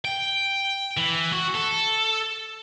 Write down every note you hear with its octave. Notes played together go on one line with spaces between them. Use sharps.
G5
E3
F#4
A4